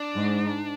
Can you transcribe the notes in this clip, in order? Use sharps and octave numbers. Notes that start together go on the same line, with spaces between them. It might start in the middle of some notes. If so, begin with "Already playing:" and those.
Already playing: D4
G#2